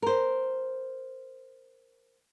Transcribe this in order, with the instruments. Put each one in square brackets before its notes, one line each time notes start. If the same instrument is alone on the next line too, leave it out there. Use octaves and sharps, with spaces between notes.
[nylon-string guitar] A#4 C5